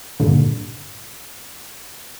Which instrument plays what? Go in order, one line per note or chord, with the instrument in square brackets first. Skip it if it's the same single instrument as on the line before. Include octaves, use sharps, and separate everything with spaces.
[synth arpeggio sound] G2 A#2 D3